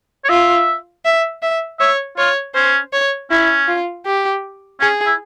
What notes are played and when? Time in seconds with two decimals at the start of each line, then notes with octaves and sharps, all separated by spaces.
0.24 C#5
0.29 F4 E5
1.05 E5
1.42 E5
1.79 C#5 E5
2.17 F4 C#5
2.54 C#4 C5
2.93 C#5
3.31 C#4 E4
3.68 F4
4.06 G4
4.80 C#4 G#4
5.06 E4